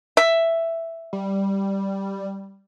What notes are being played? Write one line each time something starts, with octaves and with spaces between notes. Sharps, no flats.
E5
G3